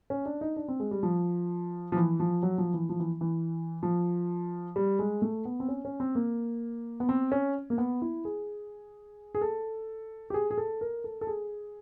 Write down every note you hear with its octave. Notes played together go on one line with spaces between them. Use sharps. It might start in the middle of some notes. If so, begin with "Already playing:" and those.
C#4
D4
D#4
D4
C4
G#3
G3
F3
F3
E3
F3
F#3
F3
E3
F3
E3
E3
F3
G3
G#3
A3
B3
C4
C#4
C#4
C4
A#3
B3
C4
C#4
A#3
B3
E4
G#4
G#4
A4
G4
G#4
G#4
A4
A#4
A4
A4
G#4